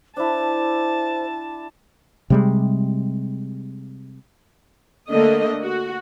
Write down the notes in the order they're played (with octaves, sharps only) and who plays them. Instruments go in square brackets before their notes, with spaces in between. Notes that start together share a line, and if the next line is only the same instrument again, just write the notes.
[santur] D4 E4 [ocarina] C5 [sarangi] A5
[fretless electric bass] C3 G3 G#3
[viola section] D3 A3 A#3 D#5
F#4